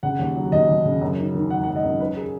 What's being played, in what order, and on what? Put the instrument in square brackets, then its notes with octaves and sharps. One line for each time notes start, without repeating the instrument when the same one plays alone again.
[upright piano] C#3 F#5
D#2
F#3
D#2 D#5
D#2
C#3
F#2
D#3
D#3
G#1 F#5
G#1 F#5
D#5
F#2
F#3 B4
G#4